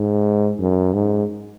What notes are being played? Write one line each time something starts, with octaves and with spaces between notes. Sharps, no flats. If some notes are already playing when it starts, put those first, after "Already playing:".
Already playing: G#2
F#2
G#2